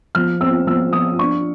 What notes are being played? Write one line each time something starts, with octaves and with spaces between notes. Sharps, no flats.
F3 F6
C4 E6
F3 E6
F3 D#6
D4 C#6